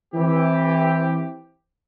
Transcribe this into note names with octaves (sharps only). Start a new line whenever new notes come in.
E3 C4 G4